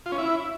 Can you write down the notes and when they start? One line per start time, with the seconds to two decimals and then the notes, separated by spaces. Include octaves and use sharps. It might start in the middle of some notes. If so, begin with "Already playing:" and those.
0.06 F4
0.12 C#4
0.18 E4